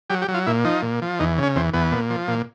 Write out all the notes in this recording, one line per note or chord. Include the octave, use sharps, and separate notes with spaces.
F#3 G4
G4
F#3
F4
A#2 E4
F3 D#4
A#2
F3
E2 D#4
C#3 C#4
E2 C4
E2 B3
A#2
F3
A#2